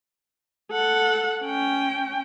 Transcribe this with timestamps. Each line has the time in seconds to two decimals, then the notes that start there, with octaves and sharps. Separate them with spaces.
0.72 A4 F#5
1.43 C#4 G5